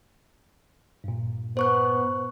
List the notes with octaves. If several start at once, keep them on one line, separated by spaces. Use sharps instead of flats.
G2 A#2
B3 C5 C#6 F#6